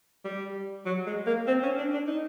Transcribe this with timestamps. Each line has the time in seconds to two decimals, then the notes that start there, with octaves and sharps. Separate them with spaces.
0.24 G3
0.86 F#3
1.06 G#3
1.26 A#3
1.47 C4
1.63 C#4
1.78 D4
1.93 D4
2.07 D#4